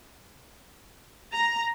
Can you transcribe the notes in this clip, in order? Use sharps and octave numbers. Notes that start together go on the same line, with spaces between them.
A#5